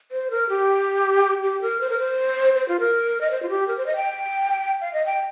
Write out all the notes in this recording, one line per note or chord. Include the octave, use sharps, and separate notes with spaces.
C5
A#4
G4
G4
A#4
C5
A#4
C5
C5
F4
A#4
D#5
C5
F4
G4
A#4
C5
D#5
G5
F5
D#5
G5